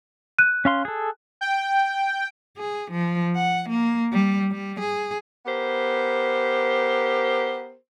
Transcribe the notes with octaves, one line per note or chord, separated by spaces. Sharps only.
F#6 D#7
C#4 F5 C6
G#4 A4
G5
G#4
F3
F#5
A#3
G3
G3
G#4
B3 G4 A#4 C5